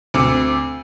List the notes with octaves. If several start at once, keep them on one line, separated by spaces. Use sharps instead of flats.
D2 C4 D6 E6 C#7